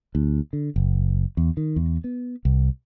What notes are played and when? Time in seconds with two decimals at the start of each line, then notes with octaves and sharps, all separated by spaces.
0.15 D2
0.53 D3
0.76 F#1
1.37 E2
1.57 D#3
1.76 E2
2.04 B3
2.45 C2